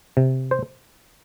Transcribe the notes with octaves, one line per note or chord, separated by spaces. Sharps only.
C3
C5